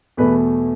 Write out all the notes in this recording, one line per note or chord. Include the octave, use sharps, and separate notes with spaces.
E2 B2 A3 B4